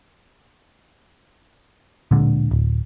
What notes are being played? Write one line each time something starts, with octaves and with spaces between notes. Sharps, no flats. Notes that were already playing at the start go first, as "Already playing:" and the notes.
D1 A#2 D3 G#3
D1